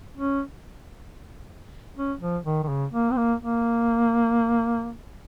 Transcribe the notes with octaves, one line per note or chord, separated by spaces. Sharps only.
C#4
C#4
F3
D#3
D#3
C#3
A#3
C4
A#3
A#3